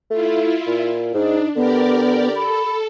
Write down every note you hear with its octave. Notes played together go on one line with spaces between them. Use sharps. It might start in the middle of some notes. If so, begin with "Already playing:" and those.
A3 E4 F4
A#2
G#2 D4 D#4
D3 B3 G4 A#4 D5
A4 B5